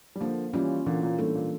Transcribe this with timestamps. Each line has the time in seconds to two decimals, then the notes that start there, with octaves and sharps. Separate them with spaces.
0.16 G3
0.21 D3 F3 A#3
0.53 E3 G3 C#4 F4
0.86 A#2 D3 E3
1.03 A#2
1.19 A2 G3 A#3 D4 A4
1.35 A#2